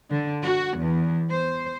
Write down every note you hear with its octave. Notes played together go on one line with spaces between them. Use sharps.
D3
F#4
E2
C5